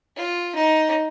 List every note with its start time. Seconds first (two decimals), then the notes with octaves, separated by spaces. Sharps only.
0.16 F4
0.55 D#4